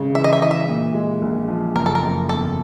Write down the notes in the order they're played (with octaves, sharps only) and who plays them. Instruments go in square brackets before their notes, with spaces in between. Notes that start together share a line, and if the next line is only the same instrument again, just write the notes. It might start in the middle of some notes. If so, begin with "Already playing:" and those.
Already playing: [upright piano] G#1 C#3
[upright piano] E3 [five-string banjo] E5
[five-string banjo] D#5
E5
[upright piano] E3 [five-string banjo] D#5
[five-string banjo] E5
[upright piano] A#2
G#3
A#1
F3
[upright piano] F#1 [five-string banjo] A#4
[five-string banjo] A4
A#4
[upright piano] F#1
[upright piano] E2 [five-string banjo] A4